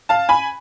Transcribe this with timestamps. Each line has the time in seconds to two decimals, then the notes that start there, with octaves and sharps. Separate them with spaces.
0.09 F5 A5
0.29 G#5 B5